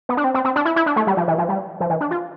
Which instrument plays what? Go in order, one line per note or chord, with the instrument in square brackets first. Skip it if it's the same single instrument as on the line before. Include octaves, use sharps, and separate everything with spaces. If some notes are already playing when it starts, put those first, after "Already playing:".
[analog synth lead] B3
D4
C4
C4
C4
D4
E4
E4
D4
A3
G3
F3
E3
F3
G3
F3
E3
D4
F4